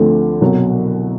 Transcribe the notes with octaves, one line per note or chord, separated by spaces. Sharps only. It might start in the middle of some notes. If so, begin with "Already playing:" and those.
Already playing: D2 D3 F3 A3 C4
C2 B2 F#3